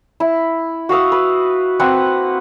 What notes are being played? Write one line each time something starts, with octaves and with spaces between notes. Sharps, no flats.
E4
F#4 F5 D#6 E6
B4
A#3 C4 B4 F#5